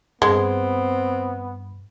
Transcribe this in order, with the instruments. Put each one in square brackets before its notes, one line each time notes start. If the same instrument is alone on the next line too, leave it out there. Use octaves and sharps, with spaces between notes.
[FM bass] G2 [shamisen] G#3 [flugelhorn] B3 [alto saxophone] C4